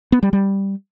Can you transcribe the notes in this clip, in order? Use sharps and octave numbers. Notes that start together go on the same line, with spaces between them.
B3
G3
G3